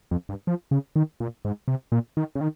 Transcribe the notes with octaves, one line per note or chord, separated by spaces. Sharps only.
F2
G2
F3
C#3
D#3
A#2
G#2
C3
A#2
D#3
C#3
D#3